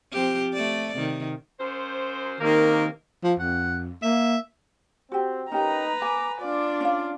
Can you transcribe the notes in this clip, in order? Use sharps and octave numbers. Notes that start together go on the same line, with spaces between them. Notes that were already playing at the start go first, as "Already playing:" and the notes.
F3 C4 G4
A3 D5
C3 D#3
F#2 C5
C3 D#3 A#3
F3
F2 F#5
A#3 E5
C4 F#4 G4
C#4 D#4 G4 A#4 B4 A#5
G#5 D6
D4 F4 D5
C#4 F5